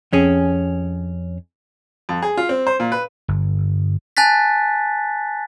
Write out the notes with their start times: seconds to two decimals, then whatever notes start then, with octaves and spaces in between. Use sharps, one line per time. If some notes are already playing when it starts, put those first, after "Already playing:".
0.13 F2 C#4 G#4
2.09 F2
2.23 G#4
2.37 F4
2.49 C4
2.67 C5
2.80 A#2
2.92 B4
3.28 G1
4.17 G#5 A5 F#6 A6 B6